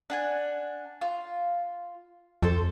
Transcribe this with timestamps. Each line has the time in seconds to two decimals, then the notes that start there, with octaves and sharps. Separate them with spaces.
0.10 D4 F#5 G#5
1.01 F4
2.42 F2 A4 C5 A5